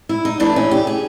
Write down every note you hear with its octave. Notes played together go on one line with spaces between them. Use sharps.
E4
D#4
G2 E3 A3 D4
C#4
G4
G#4